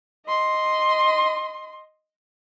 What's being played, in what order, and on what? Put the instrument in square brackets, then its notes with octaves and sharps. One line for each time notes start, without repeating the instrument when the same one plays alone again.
[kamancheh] D#5 C6